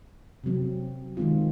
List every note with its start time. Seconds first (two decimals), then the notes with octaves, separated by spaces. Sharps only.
0.44 C3 F#3 C4
1.17 D#3 G#3 C4 F4